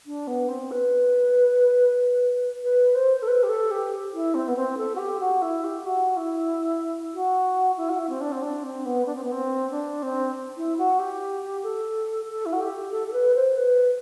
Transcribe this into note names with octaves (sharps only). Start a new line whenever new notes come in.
D4
B3
C4
B4
B4
C5
A4
B4
G4
A4
G4
E4
C4
B3
C4
A4
F#4
G4
F#4
E4
G4
F#4
E4
F#4
E4
F#4
E4
C4
D4
C4
D4
C4
B3
D4
C4
B3
C4
D4
C4
E4
F#4
G4
A4
A4
E4
F#4
G4
A4
A4
B4
C5
B4